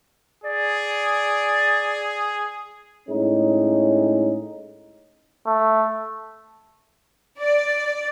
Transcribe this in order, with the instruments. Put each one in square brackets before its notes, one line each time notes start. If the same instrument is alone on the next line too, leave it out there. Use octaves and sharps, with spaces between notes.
[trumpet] G#4 [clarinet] D5
[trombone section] A2 G#3 C#4 D#4
[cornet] A3
[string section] D5